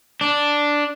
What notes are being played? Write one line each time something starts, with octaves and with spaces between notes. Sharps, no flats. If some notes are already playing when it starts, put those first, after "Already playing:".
D4